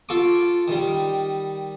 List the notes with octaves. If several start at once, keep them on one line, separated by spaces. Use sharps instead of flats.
F4 A4 C#6 D6
D#3 G3